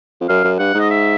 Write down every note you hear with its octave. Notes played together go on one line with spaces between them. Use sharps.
F2
F#2 F5
F#2
G2 F#5
G#2
D#5
E5